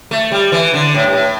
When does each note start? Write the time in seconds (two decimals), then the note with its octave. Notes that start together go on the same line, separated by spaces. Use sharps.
0.11 A3
0.32 G3
0.52 E3
0.74 D3
0.94 A2
1.03 G2
1.13 A2